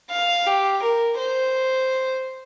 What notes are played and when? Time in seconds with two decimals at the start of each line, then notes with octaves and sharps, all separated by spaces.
0.11 F5
0.46 G4
0.83 A#4
1.18 C5